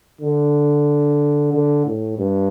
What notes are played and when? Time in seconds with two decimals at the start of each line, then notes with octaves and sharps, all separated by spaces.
0.21 D3
1.53 D3
1.86 A2
2.18 G2